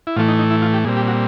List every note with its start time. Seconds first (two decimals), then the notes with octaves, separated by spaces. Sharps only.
0.07 E4
0.16 A2 E3 A3 F4
0.29 D#4
0.39 D#4
0.51 E4
0.62 F4
0.74 G4
0.85 A#2 G3 C4 G#4
0.97 G4
1.07 F#4